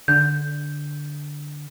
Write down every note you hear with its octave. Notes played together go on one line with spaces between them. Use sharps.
D3 G6